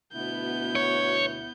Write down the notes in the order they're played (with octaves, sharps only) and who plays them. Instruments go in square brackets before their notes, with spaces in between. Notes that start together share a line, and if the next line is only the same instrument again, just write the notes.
[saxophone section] D2 B2 E4 [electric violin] B3 G6
[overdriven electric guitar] C#5